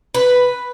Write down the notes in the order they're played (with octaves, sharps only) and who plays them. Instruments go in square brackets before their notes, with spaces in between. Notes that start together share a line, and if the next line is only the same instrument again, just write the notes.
[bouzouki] B4